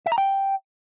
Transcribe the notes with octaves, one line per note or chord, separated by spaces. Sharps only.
E5
A#5
G5